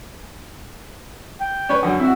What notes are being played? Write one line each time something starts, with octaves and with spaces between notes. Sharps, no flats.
G5
C#4 B4 C#5
F#2 D3
C4 E4 F#4